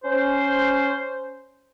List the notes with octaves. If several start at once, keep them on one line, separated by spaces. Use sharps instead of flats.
C#4 C5